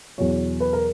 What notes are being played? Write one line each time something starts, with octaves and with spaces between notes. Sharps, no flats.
E2 B2 F#3 C#5
B4
A#4